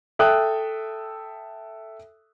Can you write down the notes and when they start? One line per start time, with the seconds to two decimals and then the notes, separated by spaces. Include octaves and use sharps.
0.19 A4 E5 G5 D#6 F#6